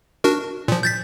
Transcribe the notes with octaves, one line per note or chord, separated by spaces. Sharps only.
D4 F#4 A#4
A#2 F3
G6 A6 B6